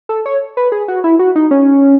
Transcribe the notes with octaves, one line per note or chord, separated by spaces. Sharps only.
A4
C#5
B4
G#4
F#4
E4
F#4
D#4
C#4